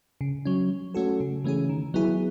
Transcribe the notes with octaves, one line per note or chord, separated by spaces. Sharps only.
C#3
F#3 C#4
F#3
A3 C#4 F#4 A4
C#3
E3 A3 C#4 G#4
D#3
F#3 B3 E4 G#4